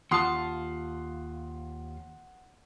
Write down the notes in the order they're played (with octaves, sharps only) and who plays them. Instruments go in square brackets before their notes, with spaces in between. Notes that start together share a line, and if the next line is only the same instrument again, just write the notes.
[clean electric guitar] D#2 F4 A5 [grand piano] F#5 C6 D#6